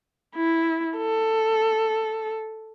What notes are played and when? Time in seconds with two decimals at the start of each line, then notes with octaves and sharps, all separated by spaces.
0.36 E4
0.97 A4